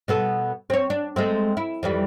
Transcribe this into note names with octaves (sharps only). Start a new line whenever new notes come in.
B2 B3 A4
C4 C#5
D4
G#3 A3 C4
E4
F2 E3 G3